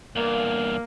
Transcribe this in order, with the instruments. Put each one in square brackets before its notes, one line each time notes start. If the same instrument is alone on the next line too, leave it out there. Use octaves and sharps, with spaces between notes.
[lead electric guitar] E2 G2 [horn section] A#3